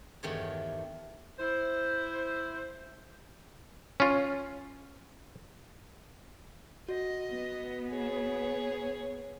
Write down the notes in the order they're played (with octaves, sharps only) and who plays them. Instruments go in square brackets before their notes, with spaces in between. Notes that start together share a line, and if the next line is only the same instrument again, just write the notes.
[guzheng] E2 G2 D#3 A3 G4 C#5
[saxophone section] E4 C5
[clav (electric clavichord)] C#4 F4
[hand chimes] F#4 [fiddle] D#5
[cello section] B3
[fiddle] G#4 C#5